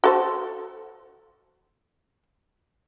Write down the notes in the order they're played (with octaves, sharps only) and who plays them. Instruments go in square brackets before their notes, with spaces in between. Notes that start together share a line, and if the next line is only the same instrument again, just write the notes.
[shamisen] F#4 A4 C5